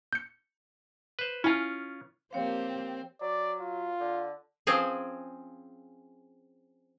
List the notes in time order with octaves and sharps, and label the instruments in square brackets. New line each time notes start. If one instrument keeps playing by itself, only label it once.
[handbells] G6 C#7
[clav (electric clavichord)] B4 C5
[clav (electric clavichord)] C#4 F4 [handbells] E4 G#5
[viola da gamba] F3 A#3 G4 [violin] C4 [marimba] C#5 F5
[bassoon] F#3 [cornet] D5
[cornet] F4
[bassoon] D3
[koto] F3 C4 C#4 G#4 C5